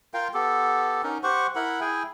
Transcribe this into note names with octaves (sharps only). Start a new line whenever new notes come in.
F4 A#4 F5 G5
B3 G4 A4
C#4 D#4 A#4
G4 C5 F#5 C#6
E4 A#4 F#5 B5
E4 G#4 G5 G#5